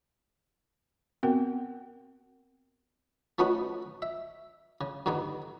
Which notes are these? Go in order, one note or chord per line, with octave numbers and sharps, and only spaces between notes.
B3 C4 F#4 A#4 G5
F3 A3 B3 C#4 D#4 F#4
E5
C#3
G2 D3 D#3 A#3 B3